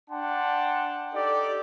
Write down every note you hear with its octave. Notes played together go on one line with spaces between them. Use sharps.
D4 F#5 G5 A5 C6
D#4 G4 A4 D5